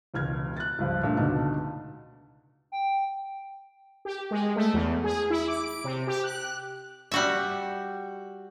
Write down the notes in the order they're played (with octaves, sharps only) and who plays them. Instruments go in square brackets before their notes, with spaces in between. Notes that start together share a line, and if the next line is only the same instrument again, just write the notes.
[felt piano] E1 C#2 F6 G#6
F#6 A6
C#2 G2 F3
A#2 A3 D4
C#2 B2 D3 D#4 A5
[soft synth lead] G5
[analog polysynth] G4
G#3
A3
E2
G#4
E4
D6
D7
C3
G4
F#6
[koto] G3 F#4 E5